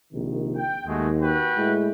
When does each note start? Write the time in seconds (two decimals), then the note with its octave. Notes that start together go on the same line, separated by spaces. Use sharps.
0.13 A#1 C3 D#3
0.56 G5
0.86 D#2 G#3 A3 F#4
1.23 F#4 B4 G5
1.57 A2 G#3 E4